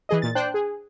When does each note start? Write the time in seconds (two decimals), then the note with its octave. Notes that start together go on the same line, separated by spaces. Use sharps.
0.09 E3 G#4 D#5
0.22 A#2 A6
0.35 D4 C5 G5 F#6
0.54 G#4